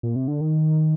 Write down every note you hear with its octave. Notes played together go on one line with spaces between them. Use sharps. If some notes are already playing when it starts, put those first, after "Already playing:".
A#2
C3
D3
D#3